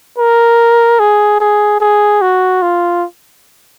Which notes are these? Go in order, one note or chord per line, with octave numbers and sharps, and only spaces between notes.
A#4
G#4
G#4
G#4
F#4
F4